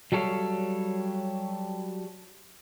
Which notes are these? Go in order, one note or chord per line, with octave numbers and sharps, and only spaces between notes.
F#3 G3 A4 C#5 F5